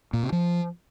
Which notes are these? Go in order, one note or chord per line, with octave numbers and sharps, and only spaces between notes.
A#2
C3
F3